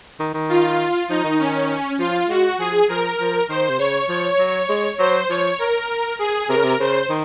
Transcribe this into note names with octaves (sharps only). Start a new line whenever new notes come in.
D#3
D#3
F4
F3 D#4
D#3
C#4
F3 F4
G#3 F#4
F3 G#4
F3 A#4
F3
D#3 C5
C3
C#3 C#5
F3 C#5
F#3
G#3
F#3 C5
F3 C#5
A#4
G#4
C3 A#4
C#3
C3
C#3 C5
D#3